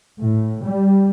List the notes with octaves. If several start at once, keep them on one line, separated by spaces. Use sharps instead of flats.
A2
G3